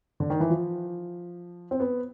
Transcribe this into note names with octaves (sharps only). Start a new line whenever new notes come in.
D3
D#3
E3
F3
C4
B3